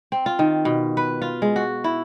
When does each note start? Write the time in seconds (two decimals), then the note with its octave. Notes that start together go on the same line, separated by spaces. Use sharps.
0.12 C4
0.26 F4
0.39 D#3
0.65 B2
0.97 B4
1.22 F4
1.42 G#3
1.56 F#4
1.84 E4